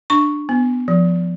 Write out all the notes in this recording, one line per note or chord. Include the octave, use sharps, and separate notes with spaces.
D4 C#6
B3
F3